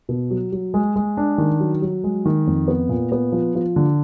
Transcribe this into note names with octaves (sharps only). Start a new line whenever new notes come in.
B2
F#3
F#3
G#3
G#3
D4
D#3
F#3
F#3
G#3
D#3
F2
B3
A#2
B3
F3
F3
D3